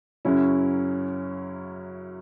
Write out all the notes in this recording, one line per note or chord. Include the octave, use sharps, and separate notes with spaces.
F#2 C#3 F#3 C#4 E4